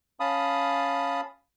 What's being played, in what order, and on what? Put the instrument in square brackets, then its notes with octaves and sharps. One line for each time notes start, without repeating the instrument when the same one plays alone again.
[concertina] C#4 F5 A5 B5 D#6